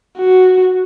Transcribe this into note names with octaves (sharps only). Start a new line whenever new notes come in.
F#4